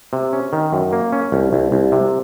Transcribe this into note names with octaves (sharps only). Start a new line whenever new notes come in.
C3
C#4
D#3
F#2
A#3
C#4
C2
C2
C2
C3